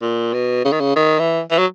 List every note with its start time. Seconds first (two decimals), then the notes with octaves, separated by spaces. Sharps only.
0.02 A#2
0.33 B2
0.64 C#3
0.72 D#3
0.81 C#3
0.95 D#3
1.19 E3
1.51 E3
1.58 F#3